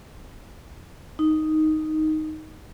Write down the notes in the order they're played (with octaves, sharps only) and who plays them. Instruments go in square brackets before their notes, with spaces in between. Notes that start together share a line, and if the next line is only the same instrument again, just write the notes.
[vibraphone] D#4